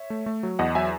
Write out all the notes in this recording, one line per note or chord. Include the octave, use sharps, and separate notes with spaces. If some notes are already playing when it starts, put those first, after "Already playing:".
Already playing: C#5 E5
A3
A3
F#3
E2 D#5 F#5
F#3 E5 G#5